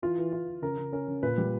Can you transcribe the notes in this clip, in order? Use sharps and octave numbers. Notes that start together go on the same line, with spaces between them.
E3 F4
E3
E3 F4
E3
C#3 A#4
C#3
C#4 A#4
C#3
A#2 B4
G3